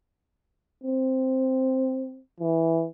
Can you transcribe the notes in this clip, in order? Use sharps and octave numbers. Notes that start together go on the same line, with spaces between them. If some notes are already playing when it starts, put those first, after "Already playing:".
C4
E3